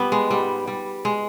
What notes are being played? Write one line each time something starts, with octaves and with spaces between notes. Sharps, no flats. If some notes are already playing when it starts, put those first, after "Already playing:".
Already playing: G3 B3
G#3
G#2 G3
G3
G#3